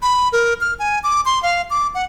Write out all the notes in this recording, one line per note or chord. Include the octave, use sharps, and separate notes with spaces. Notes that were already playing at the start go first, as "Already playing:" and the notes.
B5
A#4
F6
G#5
D6
C6
F5
D6
F#5